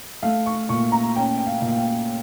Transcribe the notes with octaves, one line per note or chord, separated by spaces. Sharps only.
A3 F5
C#6
A#2 C#6
A#5
C#4 G5
G5
F5
A#2
F5
G5